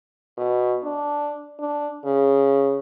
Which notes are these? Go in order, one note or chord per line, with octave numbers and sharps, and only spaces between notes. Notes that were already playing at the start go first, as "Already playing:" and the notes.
B2
D4
D4
C#3